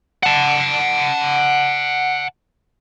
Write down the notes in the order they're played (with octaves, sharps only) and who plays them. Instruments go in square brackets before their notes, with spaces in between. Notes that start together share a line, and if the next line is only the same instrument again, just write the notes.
[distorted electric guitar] F#5 A5